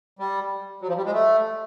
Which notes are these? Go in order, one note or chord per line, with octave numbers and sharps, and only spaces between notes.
G3
F#3
F3
G3
G#3
A3